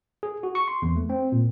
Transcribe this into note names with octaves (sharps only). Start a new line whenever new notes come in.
G#4
F#4
C#6
C6
E2
A3
C4
A#2